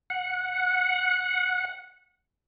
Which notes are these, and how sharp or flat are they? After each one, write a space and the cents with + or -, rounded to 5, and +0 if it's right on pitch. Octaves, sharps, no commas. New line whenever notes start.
F#5 -15